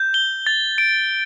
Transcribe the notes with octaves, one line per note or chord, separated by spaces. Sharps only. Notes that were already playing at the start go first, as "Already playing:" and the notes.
Already playing: G6
G7
A6
D7